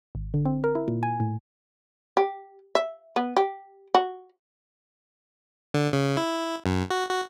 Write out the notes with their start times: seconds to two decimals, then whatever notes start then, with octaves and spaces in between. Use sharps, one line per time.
0.15 G#1
0.34 D3
0.45 C4
0.64 A#4
0.75 E4
0.88 A#2
1.03 G#5
1.20 A2
2.17 G4
2.75 E5
3.16 B3
3.37 G4
3.95 F#4
5.74 D3
5.93 C#3
6.17 E4
6.66 F#2
6.90 F#4
7.11 F#4